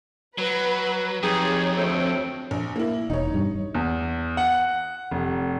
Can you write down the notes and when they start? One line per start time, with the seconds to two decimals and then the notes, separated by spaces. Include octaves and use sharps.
0.38 F#3 B4
1.23 F2 D#4 G4 G#4 C#5
1.77 D2 A3 C4
2.51 A#1
2.76 A#3 E4
3.10 E1 E2 D#4 C#5
3.34 G2
3.75 E2
4.37 F#5
5.11 F1